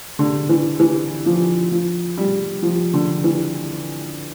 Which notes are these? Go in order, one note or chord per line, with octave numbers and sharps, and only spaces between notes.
D3
E3
E3
F3
F3
G3
F3
D3
E3